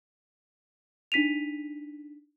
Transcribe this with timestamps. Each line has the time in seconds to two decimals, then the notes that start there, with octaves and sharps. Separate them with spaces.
1.12 D4 D#4 B6 D#7 F7